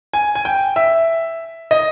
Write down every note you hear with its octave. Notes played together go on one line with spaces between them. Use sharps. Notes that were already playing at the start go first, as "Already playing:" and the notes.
G#5
G#5
G5
E5
D#5